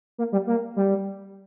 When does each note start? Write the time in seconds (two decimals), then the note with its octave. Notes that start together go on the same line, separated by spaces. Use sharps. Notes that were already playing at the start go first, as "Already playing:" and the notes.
0.18 A#3
0.32 G3
0.47 A#3
0.76 G3